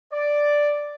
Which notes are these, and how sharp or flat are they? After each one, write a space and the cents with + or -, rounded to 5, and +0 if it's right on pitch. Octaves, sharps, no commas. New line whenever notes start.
D5 +0